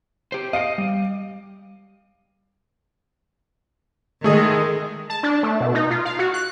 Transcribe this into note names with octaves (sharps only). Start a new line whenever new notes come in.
G4 C5
D#5 F5 C7 D7
G3
D#3 G#3 A3 G#4 D#6
A5
D4
A3
B2
D#4
F4
F5
F#4
F#6